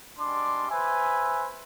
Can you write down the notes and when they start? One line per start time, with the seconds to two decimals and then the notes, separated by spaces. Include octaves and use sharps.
0.19 G3 G#3 D4 C6 D6
0.70 B4 C5 E5 G#5